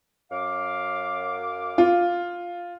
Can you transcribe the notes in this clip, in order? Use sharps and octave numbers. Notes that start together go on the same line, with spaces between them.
F#2 F5 D6
F4